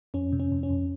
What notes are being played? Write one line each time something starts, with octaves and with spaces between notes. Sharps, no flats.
F2 C#4
C3
C#4
F2
C#4
F2